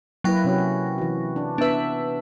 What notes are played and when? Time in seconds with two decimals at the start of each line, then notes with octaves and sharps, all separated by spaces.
0.24 F#3 A#3 E4 B4 G5 A#6
0.44 C3 C#4 F#4
0.98 E3 F#4
1.36 D4
1.58 B3 D4 B4 E5